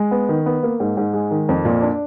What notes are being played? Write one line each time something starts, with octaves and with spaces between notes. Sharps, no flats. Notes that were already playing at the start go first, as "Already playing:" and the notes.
Already playing: G#3
B3
D#3
B3
A#3
G#2
G#2
G#3
D#3
F2
A#2
D4